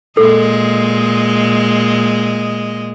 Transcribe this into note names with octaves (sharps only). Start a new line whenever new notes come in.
A#2 G#3 A4 D#5